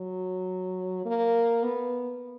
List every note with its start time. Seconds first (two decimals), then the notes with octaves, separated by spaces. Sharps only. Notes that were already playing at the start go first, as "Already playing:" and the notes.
Already playing: F#3
1.06 A#3
1.63 B3